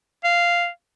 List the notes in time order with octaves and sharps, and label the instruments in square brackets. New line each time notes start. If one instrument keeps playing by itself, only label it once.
[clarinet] F5